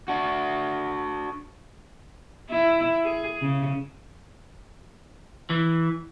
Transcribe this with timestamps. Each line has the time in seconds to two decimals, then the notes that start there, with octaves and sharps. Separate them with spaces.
0.08 D4 F#4
2.50 E4
3.04 G#4
3.42 C#3
5.50 E3